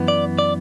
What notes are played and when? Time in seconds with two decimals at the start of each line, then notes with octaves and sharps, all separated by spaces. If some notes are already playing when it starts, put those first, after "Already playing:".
Already playing: F#2 E3 B3
0.08 D5
0.39 D5